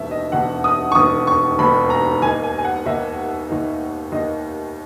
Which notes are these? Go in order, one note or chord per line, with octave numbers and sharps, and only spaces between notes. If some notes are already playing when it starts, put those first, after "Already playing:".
Already playing: E1 D#2 D#3 E5
D#5
E1 D#2 D#3 F#5
D#6
C#6
E1 D#2 D#3 D#6
C#6
E1 D#2 D#3 B5
A#5
D#2 D#3 A#3 D#4 G#5
G#5
G#5
F#5
D#2 D#3 A#3 D#4 E5
D#2 D#3 A#3 D#4
D#2 D#3 A#3 D#4 D#5